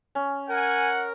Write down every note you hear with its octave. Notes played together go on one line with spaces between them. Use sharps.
C#4
A#4 F#5 G#5